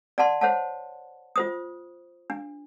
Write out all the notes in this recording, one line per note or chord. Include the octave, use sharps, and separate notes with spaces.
D5 F#5 A5 C6
C5 C#5 F#5 A5
F4 C5 D#6
D4